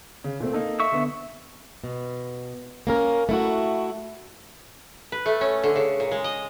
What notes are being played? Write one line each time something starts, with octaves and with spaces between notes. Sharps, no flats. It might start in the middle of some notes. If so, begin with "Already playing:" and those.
C#3
A#2 A3 C4
A#3 D#4 A4
E5 C#6 E6
D3 B3
B2
A#3 C#4 A#4
A3 E4 F#4
B4
A3
C#4
D3
C#3
A#2
G#3
D#5